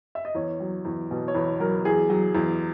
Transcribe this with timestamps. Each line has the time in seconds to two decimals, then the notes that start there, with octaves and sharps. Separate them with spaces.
0.15 E5
0.25 D#5
0.35 E2 C#5
0.60 F#3
0.85 E2
1.11 B2
1.28 C#5
1.35 E2 B4
1.60 F#3 A#4
1.85 E2 G#4
2.10 F#3
2.35 E2